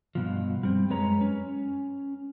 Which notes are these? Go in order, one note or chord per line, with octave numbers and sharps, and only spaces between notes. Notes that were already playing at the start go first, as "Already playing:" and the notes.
G2 B2 F3
G3 C4
F#2 G#3 B4 C#5 A#5
C#4